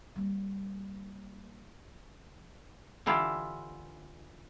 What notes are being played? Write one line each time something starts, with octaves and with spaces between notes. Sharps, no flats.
G3 A#3
D3 E3 E4 F4 G4